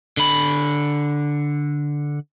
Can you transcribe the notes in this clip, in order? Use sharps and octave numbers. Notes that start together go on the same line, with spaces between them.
D3 B5